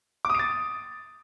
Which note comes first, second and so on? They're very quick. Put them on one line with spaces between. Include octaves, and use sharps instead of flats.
D6 D#6 D7 A6